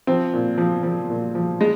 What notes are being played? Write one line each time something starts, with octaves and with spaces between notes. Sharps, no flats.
F3 C4
A#2
F3
F3
A#2
F3
G#3